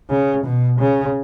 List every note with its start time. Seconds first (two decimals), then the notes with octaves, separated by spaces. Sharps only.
0.10 C#3
0.45 B2
0.80 C#3